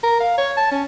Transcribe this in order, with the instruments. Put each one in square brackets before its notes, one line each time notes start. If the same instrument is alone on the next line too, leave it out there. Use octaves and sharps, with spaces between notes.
[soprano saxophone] A#4
F5
C#5
A5
C#4